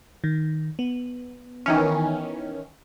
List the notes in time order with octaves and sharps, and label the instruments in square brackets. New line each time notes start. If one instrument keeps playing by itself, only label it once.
[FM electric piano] D#3
B3
[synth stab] D#3 E3 C#4